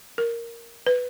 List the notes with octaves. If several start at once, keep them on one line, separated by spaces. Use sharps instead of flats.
A#4
B4